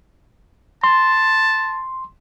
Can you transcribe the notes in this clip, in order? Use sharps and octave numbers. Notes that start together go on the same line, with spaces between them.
A5 C6